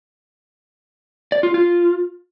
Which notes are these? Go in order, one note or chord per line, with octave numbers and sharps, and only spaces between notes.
D5
F4
F4